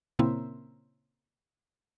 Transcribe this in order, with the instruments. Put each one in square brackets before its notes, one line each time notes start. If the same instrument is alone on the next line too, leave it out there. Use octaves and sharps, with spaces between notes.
[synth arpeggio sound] A#2 C#3 A#3 C4 E4